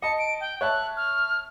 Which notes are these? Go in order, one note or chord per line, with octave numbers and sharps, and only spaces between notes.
D#5 A5 C#7
D7
G5
C#5 E5 A5 F#6
F6